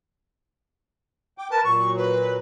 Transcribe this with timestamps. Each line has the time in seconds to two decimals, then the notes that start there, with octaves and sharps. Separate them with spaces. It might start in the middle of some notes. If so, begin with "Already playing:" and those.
1.38 G5 D6
1.51 A#4 B4 A5
1.64 A#2 F#3 C#6
1.97 B4